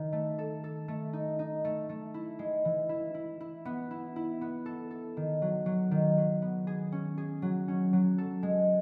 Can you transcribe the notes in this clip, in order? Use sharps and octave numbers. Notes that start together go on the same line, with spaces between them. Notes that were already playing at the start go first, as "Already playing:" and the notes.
Already playing: D#3 D#4
A3
A4
A4
A3
D#4
D#4
A3
A3
E4
G#3
E3
E4
E4
E4
B3
E4
E4
B3
A4
A4
D#3
F#3
F#3
D#3
F#3
B3
G#4
C#4
G#4
F#3
C#4
F#3
A4
G#3